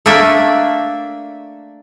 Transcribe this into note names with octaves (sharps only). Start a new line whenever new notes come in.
A3 A#3 D4 E5